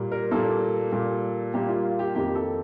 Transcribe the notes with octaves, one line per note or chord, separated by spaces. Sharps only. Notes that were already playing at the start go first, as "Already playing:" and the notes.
Already playing: A#2 G3 A#3
A#4
A#2 G3 A#3 A4
A#2 G3 A#3
A#2 G3 A#3 G4
F4
F4
G4
F2 D#3 A#3 G4
A4